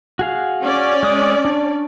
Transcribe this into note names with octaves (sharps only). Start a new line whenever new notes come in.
F#4 G#4 F5
C#4 D5
G#3 D#6
D4